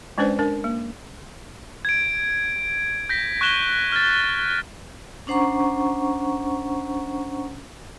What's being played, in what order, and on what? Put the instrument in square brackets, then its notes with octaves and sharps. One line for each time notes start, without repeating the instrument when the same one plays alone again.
[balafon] G#3 C#4 D4 B4 C5 D5
D4 A#4
A#3
[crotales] G#6 D7
G6 A#6 B6
C#6 F#6 A#6 E7 G7
F6 A6
[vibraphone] C#4 D4 C5 F#5 A#5 C#6